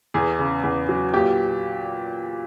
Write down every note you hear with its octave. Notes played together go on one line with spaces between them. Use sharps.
E2 G#4
C#3
E2
F#3
A#2 G4